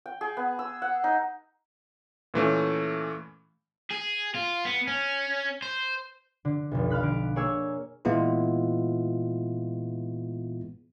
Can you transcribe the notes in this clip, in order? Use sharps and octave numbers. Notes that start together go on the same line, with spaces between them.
G5
G#4
B3
E6
F#5
D#4
A#2 E3 A3 C#4
G#4
F4
B3
C#4
C5
D3
F1 B1
F5 B5 F6 F#6 B6
D3 D7
A#3 G#4 C#5 G#5 E6
A#2 E3 G#3 B3 E4 F4